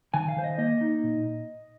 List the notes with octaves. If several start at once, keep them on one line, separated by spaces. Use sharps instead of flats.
D#3 G#5
F5
D#3 C5
D#5
A#3 D#5
D#4
A#2